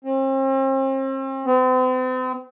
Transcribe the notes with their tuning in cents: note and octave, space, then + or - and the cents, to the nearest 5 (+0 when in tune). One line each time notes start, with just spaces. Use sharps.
C4 +40
C4 -40